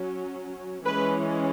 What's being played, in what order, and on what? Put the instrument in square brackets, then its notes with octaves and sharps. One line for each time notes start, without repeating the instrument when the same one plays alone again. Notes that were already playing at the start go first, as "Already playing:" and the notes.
Already playing: [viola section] F#3 C#4
E3 G#3 C#4 B4